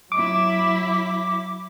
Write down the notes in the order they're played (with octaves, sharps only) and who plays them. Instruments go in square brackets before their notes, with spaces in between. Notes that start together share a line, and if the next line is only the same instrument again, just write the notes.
[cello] F#3 E4 [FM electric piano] D6